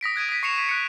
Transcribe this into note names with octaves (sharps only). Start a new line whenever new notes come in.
D#6 A#6 B6 D7
F#6 G#6 D7 D#7
D#6 B6
C#6 C7 C#7 E7 F7
D#7
F#6 C#7